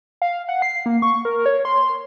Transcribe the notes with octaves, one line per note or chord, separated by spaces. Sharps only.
F5
F#5
C7
A#3
C#6
A#4
C#5
C6